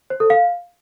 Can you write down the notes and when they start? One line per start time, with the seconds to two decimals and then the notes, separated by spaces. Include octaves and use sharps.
0.10 C5
0.20 A4
0.30 F5